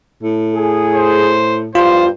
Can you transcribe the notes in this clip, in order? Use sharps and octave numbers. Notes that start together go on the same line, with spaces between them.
A2
G#4
C5
E2 G2 F4 C5